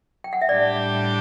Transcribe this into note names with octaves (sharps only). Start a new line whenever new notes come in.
G5
F#5
E5
A2 G3 D4 G4 D5